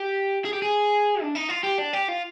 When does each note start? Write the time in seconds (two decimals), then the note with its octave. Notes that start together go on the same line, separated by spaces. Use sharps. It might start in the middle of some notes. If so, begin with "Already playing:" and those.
Already playing: G4
0.45 G#4
0.53 G4
0.62 G#4
1.22 D4
1.36 D#4
1.49 F4
1.64 G4
1.79 D4
1.93 G4
2.09 F4